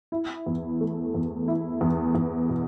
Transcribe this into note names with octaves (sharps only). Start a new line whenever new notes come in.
E4
E2
A3
E2
E4
E2
E2
B2